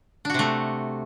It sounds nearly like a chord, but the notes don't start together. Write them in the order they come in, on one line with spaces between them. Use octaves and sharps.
D4 F#4 C3 A3